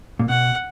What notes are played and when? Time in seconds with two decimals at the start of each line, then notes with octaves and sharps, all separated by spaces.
0.19 A#2
0.29 B2 F#5